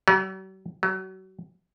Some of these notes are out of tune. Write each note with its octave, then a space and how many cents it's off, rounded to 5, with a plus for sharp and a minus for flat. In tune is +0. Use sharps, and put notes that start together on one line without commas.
F#3 +45
F#3 +30